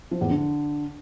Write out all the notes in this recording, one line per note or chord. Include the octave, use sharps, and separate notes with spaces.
F3
E2
D3